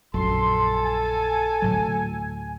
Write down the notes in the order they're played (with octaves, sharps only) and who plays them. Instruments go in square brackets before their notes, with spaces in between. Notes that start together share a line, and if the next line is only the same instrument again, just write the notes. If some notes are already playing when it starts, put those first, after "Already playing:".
[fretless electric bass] A#1 F#2 [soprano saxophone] A4 [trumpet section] C6
[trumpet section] G#5
[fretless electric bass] D2 A2 F#3